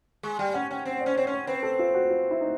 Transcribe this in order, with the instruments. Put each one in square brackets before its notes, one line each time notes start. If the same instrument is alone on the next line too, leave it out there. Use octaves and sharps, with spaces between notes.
[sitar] G#3 [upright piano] C#6
[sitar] G3 [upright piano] G5
[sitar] C#4 [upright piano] F#5
[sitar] C#4 [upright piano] G5
[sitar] C4
[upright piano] D5
[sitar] C#4
[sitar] C4 [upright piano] C#5
[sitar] C#4 [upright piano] C#5
[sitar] C4 [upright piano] B4
[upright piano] A4
F4
F#4
F4
E4
D#4